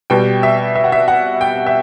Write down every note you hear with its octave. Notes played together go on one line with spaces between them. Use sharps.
B2 G3 G5
E5
E5
F#5
E5
F#5
G5
E5